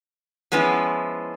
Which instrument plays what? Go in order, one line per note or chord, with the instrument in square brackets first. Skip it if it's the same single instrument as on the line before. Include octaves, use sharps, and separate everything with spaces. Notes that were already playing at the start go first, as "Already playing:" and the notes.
[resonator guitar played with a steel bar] F3 G#3 B3 C#4 E4